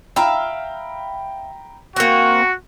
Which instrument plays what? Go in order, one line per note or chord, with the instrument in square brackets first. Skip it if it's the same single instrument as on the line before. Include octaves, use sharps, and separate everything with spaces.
[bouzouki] E5 F5 [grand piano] G5 A#5 B5
[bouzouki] A#3 C4 [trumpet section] F#4